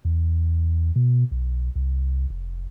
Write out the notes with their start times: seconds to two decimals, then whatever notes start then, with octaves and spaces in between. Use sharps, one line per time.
0.05 E2
0.96 B2
1.32 B1
1.76 C2
2.30 F1